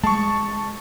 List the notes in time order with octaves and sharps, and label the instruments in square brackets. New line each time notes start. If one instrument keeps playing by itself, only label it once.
[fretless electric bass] G#3 [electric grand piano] A5 C#6